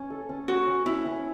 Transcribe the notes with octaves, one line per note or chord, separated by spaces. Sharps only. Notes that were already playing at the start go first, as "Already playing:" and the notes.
Already playing: C#4
A4
C#4
C#4 F#4
C#4
C#4 E4
C#4